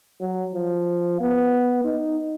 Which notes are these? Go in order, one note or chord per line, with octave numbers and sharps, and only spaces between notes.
F#3
F3
B3
D#4